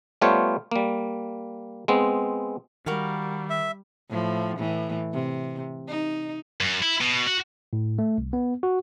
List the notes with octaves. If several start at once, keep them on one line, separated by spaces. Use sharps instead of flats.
G3 A3 B3 F4 C5 C#5
G3 A#3
G#3 B3 C4
D#3 G3 F#4 A#4 F5
E5
A2 F3
A2 E3
C3
D#4
F#2
E4
B2
F#4
A2
A3
C2
B3
F#4